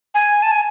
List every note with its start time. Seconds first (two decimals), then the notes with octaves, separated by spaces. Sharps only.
0.14 G#5
0.42 A5
0.51 G#5